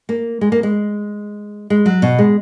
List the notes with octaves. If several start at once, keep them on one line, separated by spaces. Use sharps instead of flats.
A#3
G#3
A#3
G#3
G#3
F#3
B2
G#3